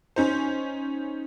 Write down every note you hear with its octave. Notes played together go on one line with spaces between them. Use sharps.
C#4 D#4 C5